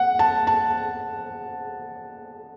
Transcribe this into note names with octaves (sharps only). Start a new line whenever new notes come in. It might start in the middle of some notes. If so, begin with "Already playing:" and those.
Already playing: F#5
A5
A5